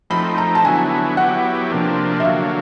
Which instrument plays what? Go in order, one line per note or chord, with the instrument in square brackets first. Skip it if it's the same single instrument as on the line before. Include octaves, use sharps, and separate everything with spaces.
[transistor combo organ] F3 A3 C4 D#4 [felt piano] B5
[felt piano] A#5
A5
[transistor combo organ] D3 F#3 B3 E4 [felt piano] G#5
[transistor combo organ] F#3 B3 E4 G4 [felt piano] F#5
[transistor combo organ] C3 F3 A#3 D4
[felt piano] E5
[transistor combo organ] D3 F#3 A#3 [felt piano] F5